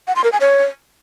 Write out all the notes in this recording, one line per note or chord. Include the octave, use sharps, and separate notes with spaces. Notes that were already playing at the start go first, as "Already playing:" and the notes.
F#5
C6
A#4
G#5
C#5